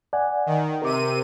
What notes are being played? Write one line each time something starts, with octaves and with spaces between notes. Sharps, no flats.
D5 F#5 G#5
D#3
C3 A#4 D6 D#7